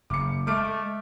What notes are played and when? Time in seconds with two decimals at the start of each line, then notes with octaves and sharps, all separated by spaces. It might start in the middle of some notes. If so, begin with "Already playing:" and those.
0.10 F#1 D6 C#7
0.47 G#3 A3 D6 F6 D7